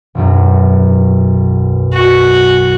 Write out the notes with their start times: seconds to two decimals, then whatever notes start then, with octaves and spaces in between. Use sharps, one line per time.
0.15 E1 B1 F#2
1.94 F#4